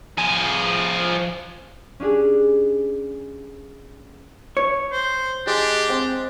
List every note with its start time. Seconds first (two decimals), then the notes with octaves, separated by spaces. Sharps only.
0.18 F3 G#4
2.00 C#4 D4 G4 G#4
4.57 C#5
4.93 C5
5.47 G#3 D4 G4
5.89 C4